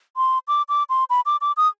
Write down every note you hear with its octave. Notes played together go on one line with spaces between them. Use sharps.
C6
D6
D6
C6
B5
D6
D6
D#6